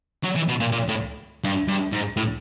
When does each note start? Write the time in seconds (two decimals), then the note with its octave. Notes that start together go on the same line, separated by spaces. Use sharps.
0.24 F#3
0.36 E3
0.48 B2
0.60 A#2
0.72 A#2
0.88 A2
1.44 G2
1.68 G2
1.93 G#2
2.17 A2